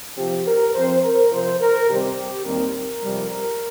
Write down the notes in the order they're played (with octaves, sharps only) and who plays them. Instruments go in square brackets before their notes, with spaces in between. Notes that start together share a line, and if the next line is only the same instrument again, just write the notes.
[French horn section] C3 F3 C4 G4
A#4
F2 F3 C4 C5
A#4
C3 F3 C4 C5
A#4
C3 D#3 G3 C4 G4
D#2 D#3 G3 C4 A#4
F2 C3 G3
A#4